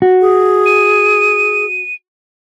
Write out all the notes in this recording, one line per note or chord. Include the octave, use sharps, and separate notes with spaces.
F#4
G#4
D#7